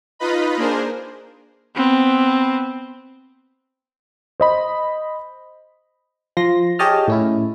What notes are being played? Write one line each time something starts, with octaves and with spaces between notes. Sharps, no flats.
D#4 F4 B4 D#5 B5
A#3 D4 G#4 A#4 C5
B3 C4
C5 D#5 B5
F3 C6 A#6
G4 G#4 C#5 D#5 A5 F6
A2 C#4 E4